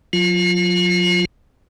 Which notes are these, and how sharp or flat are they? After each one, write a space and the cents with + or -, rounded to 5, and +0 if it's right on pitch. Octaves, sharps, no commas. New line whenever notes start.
F#3 -45 F4 +0